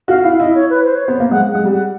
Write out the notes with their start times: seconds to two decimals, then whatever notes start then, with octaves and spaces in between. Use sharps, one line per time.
0.08 F#4 F5
0.23 E4 F5
0.40 E4 D#5
0.55 C#5
0.70 B4
0.85 C5
0.95 C#5
1.05 B3 C5
1.20 A#3
1.31 G#3 F#5
1.52 G#3 F#5
1.65 G3
1.72 F#5